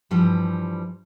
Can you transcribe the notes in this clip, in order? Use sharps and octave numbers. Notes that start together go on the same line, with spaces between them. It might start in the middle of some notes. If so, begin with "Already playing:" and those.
G2 E3 F3 G3